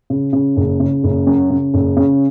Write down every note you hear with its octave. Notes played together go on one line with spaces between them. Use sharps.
C#3
C#3
F#1
C#3
F#1
F#2
C#3
F#1
C#3